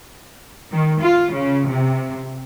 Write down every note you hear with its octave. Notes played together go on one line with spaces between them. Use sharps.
D#3
F4
C#3
C3